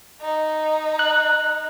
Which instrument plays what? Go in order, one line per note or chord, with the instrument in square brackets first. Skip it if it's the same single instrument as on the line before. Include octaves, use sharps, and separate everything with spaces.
[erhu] D#4
[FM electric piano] F#6